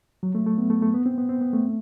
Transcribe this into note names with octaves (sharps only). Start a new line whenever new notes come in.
F#3
A3
A3
B3
A3
A3
B3
C4
B3
C4
B3
A3